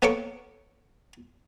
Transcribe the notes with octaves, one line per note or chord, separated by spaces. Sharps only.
A#3 B3 A4 C#5 C#6 D6